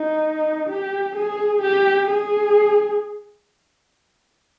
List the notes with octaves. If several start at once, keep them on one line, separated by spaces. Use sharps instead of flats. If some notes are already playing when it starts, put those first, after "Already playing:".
Already playing: D#4
G4
G#4
G4
G#4